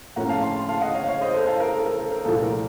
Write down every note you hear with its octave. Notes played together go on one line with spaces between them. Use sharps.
A2 F3 A#3 C#4 F#5 A#5
F5 A5
A5 C6
A5 C6
F5 A5
D#5 F#5
C#5 F5
C#5 F5
C5 D#5
A4 C5
F5 A5
A#4
A4
A#4
A4
A#4
C2 A#2 F3 A3 A4
A#4